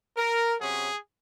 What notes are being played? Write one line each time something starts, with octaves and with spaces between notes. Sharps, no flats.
A#4
C3 F#3 C#4 G#4